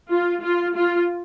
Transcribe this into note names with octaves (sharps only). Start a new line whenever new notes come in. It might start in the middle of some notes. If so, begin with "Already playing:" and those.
F4
F4
F4